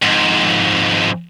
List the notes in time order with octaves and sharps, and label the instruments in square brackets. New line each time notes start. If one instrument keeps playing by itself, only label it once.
[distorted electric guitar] F2 G#2